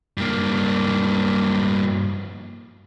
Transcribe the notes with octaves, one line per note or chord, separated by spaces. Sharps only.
G2 A#3